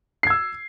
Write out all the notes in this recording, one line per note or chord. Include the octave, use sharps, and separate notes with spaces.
E6 G#6 C7